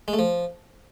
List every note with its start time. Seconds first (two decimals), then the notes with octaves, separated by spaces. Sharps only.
0.08 G#3
0.13 A3
0.19 F3